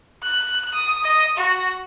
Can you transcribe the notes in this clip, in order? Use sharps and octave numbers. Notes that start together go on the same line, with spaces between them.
F#6
D#6
D#5
F#4